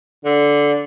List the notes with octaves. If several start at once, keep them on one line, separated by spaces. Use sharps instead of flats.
D3